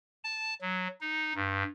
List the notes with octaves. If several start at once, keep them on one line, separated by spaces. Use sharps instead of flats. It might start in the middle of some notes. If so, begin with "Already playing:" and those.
A5
F#3
D#4
G2